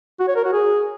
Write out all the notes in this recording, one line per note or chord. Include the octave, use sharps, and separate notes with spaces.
F#4
C#5
A#4
F#4
G#4